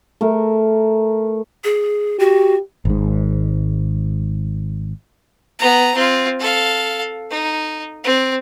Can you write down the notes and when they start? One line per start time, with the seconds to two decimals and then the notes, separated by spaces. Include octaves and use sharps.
0.21 A3 A#4
1.64 G#4
2.19 F#4 G4
2.85 G#1 G#2
5.59 B3 A#5
5.95 C4 F4
6.39 A4 F5
7.30 D#4
8.04 C4